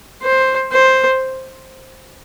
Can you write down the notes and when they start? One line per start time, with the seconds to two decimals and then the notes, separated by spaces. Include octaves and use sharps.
0.23 C5
0.72 C5